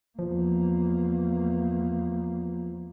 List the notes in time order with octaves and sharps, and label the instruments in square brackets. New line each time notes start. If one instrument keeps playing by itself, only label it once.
[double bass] E2 A#3 [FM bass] F3